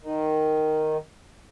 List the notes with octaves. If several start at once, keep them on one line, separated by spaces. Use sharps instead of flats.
D#3